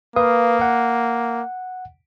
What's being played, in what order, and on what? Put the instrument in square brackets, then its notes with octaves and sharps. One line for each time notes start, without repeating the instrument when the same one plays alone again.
[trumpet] A#3 [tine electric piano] B4 F5 D#6
[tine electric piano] F#5